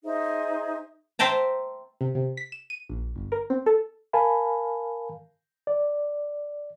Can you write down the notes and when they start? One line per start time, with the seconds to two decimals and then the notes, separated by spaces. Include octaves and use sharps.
0.04 D#4 G#4 C5 E5
1.19 C5 E5 G5 A5 A#5
2.01 C3
2.15 C3
2.37 B6
2.52 E7
2.70 D#7
2.89 A#1
3.16 G1
3.32 A#4
3.50 C4
3.66 A4
4.13 A#4 F5 G#5 A5 B5
5.67 D5